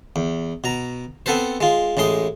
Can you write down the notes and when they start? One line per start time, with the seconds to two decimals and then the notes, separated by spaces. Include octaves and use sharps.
0.16 E2
0.64 B2 A#5
1.26 B3 C4 A4 B4 C5
1.61 G#3 F4
1.97 A1 A2 G#3 C6 D#6